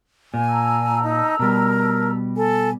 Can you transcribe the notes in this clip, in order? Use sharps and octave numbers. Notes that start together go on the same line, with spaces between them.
A#2 G#5
A5 A#5 E6
D#4
B2 G3 A#4
A4 G#5